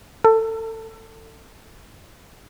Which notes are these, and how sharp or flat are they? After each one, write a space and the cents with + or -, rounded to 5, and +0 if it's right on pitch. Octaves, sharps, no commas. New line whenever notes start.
A4 +25